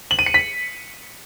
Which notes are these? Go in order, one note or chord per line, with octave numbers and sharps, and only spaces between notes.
F#7
D#7
C#7
B6